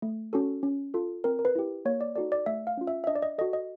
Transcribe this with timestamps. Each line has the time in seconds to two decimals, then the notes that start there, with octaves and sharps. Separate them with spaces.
0.02 A3
0.33 C#4 F#4 A4
0.63 C#4
0.94 F4 A4
1.24 C4 A#4
1.39 A#4
1.45 B4
1.55 E4 G4
1.85 A#3 C#5
2.01 D5
2.16 D#4 F#4 A4 D5
2.32 D5
2.46 A3 E5
2.67 F5
2.77 C#4 F4
2.87 E5
3.04 E5
3.07 D4 D#5
3.15 D5
3.22 D#5
3.38 F#4 A4 D#5
3.53 D#5